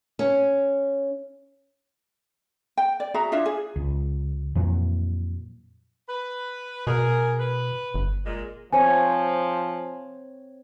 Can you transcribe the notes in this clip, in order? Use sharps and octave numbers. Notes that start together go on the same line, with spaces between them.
C#4
G5
D5
F#4 G#4 E5 A#5
D4 E4 F4 E5
G#4
C#2
F2 A#2 E3 F#3
B4
B2 G#4 A#4
B4
G1
A#2 G#3
F3 C4 C5 C#5 G#5